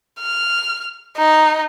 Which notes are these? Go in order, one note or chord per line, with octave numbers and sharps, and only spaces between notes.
F6
D#4